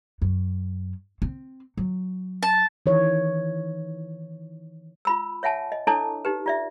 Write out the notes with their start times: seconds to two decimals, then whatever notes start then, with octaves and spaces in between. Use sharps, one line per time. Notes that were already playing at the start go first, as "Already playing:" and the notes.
0.22 F#2
1.22 C4
1.77 F#3
2.43 A5
2.86 D#3 E3 C#5
5.05 F4 B5 E6
5.43 C#5 E5 F#5 G#5 A5
5.72 D#5
5.87 D4 E4 A4 C#5 A5 D6
6.25 D#4 G4 B4
6.46 F4 D5 E5